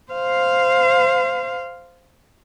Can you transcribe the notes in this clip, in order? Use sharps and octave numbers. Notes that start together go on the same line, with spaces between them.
C5 F5